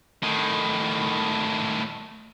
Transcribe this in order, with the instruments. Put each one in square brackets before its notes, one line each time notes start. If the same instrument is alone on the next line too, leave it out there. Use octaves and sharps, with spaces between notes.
[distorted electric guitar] A2 D#3